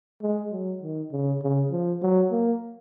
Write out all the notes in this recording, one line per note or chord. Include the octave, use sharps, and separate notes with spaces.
G#3
F#3
D#3
C#3
C#3
F3
F#3
A#3